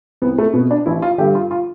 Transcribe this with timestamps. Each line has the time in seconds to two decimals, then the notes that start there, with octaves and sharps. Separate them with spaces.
0.22 C2 B3
0.38 A3
0.54 B2 B3
0.71 D4
0.86 A1 E4
1.02 F4
1.18 D3 G4
1.21 G2
1.35 F4
1.51 F4